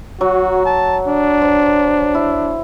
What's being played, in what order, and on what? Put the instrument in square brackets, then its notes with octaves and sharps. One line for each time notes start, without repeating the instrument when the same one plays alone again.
[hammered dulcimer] F#3 [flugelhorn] F#4
[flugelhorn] A5
D4
[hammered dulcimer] C5
E4